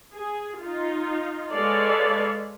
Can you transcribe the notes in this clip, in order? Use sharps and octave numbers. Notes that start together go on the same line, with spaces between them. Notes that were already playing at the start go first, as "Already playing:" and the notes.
G#4
D#4 F4
G#3 A4 B4 C#5 D5 F5